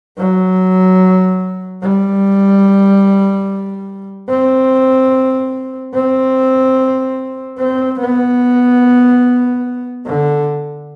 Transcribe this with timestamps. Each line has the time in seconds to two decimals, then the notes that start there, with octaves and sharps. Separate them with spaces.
0.18 F#3
1.83 G3
4.29 C4
5.95 C4
7.59 C4
8.00 B3
10.06 D3